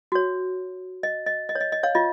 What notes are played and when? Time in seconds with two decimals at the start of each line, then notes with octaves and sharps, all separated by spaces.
0.12 F#4 C#5
1.03 D#5
1.26 D#5
1.49 D#5
1.55 C#5
1.61 D#5
1.72 D#5
1.83 C#5 F5
1.95 F4 D#5